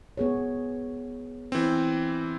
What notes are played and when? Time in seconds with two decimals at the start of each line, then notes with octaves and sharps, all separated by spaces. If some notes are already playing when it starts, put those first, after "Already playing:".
0.17 B3 G#4 C#5
1.52 E3 C4